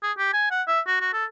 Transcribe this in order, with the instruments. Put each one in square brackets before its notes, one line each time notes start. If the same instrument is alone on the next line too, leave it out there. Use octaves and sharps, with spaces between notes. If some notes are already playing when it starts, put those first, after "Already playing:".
[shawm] G#4
G4
G#5
F#5
E5
F#4
F#4
A4